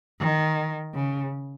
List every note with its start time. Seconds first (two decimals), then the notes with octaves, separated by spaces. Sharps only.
0.20 D#3
0.94 C#3